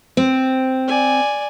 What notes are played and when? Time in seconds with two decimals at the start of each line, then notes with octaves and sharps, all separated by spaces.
0.17 C4
0.88 D5 G#5